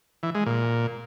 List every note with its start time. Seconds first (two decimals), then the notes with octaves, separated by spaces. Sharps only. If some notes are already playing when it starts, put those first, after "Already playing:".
0.23 E3
0.35 G#3
0.46 A#2